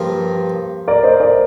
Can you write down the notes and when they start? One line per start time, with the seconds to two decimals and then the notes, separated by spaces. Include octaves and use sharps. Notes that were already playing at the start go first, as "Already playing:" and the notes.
Already playing: G2 F3 A#3 G4
0.88 A#4 D5
1.03 C5 D#5
1.20 A#4 D5